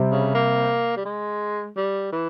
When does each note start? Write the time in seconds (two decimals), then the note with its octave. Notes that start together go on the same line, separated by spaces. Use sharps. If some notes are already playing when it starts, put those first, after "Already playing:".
Already playing: C3 G3 C4
0.11 C#3
0.35 A#3
0.96 G3
1.05 G#3
1.77 G3
2.12 E3